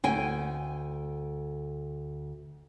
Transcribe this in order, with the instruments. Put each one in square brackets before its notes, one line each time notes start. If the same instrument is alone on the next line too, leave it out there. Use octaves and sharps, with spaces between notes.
[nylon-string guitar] D2 G5 G#5